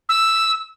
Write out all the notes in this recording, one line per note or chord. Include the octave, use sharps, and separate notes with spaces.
E6